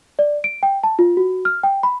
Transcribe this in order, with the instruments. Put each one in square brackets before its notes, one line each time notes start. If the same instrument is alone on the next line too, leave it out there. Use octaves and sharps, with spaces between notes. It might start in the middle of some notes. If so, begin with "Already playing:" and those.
[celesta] D5
D7
G5
A5
F4
F#4
F6
G5
B5